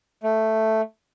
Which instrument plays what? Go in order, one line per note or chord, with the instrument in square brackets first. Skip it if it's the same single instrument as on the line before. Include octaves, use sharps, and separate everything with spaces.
[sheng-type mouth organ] A3